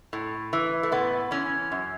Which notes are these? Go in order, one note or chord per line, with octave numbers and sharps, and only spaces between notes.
A2
E3
A3
A2 B3
E3 C#4
F#2